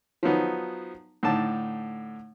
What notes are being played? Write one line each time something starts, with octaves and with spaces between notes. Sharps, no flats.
F3 F#3 B3 D#4
A2 D3 D#4 A5